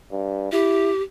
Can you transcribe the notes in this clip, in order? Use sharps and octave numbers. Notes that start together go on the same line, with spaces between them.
G2
E4 G4